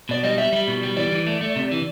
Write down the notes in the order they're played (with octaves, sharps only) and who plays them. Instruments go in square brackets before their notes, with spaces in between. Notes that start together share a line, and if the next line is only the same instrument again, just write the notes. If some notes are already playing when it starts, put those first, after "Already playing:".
[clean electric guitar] B2 [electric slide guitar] D5
[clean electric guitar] G3 [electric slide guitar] D#5
[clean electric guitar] G3 [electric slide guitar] E5
[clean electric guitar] G3
B2
G3
[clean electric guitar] E3 [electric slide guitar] D5
[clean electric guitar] E3
A3
A3
C3
E3